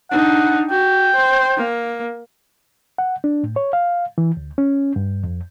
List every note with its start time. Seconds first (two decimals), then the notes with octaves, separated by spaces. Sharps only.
0.11 D4 D#4 F#5
0.70 F#4 G5
1.15 C5
1.57 A#3
2.98 F#5
3.24 D4
3.43 A2
3.56 C#5
3.73 F5
4.18 E3
4.37 D2
4.58 C#4
4.96 G2
5.24 F2